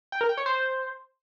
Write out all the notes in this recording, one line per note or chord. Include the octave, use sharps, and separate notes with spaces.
G5
A#4
G5
C#5
C5